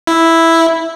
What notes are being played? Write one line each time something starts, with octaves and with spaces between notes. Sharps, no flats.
E4